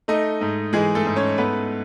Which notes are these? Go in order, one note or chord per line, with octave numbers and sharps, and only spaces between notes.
A3 D#4 D#5
G#2
E3 G#3 G#4
A3 A4
G#2
C#4 C#5
A3 B3 B4